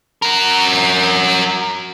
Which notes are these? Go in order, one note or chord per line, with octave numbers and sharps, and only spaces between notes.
F#4 A#4